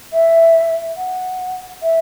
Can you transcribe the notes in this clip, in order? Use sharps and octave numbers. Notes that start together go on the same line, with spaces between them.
E5
F#5
E5